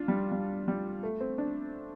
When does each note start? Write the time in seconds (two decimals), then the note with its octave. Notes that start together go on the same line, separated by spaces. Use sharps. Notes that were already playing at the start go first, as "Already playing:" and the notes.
Already playing: D4 F4
0.08 G3
0.32 G3
0.68 G3
1.03 A3
1.20 C4
1.38 D4